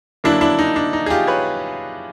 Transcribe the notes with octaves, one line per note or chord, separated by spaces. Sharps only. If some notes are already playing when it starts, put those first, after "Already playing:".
F#2 D3 F#3 A#3 D4 E4
D4 E4
D#4
D4
D#4
G#4
F4 G4
B4 C#5